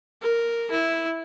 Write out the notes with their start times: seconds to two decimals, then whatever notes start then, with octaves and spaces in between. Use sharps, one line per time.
0.22 A#4
0.71 E4